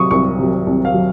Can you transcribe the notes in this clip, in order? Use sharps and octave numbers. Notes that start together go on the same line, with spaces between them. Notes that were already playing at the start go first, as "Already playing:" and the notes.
Already playing: C3 F#3 C#6 D#6
C2 C#6
C3 F#3
C2
F5
F#3